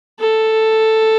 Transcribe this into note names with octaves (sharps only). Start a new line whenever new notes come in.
A4